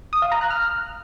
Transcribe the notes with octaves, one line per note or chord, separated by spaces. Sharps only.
D#6
F5
A#5
F#6
F6